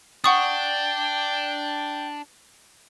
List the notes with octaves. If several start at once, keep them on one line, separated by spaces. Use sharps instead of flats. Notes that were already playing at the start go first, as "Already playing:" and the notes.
D4 F#5 G5 C#6 D#6